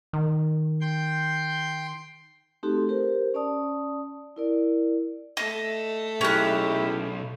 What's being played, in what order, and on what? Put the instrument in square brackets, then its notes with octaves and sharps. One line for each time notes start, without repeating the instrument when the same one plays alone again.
[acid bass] D#3
[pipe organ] G5 C6 G6
[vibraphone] A3 C4 D#4 F#4 G4 A4
G4 A#4 C5
C#4 D5 A5 D#6
E4 A#4 D5
[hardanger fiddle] A3 [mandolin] D#5
[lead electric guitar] B1 [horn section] G#3 E4 G4 [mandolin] C#4 F#6